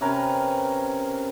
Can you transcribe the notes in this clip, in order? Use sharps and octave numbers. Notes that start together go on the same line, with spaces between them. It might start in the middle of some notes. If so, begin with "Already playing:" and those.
C3 C#4 A#4 B4